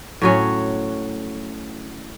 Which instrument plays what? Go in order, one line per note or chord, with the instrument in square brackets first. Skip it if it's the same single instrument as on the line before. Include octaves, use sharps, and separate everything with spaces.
[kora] A2 F#3 C#4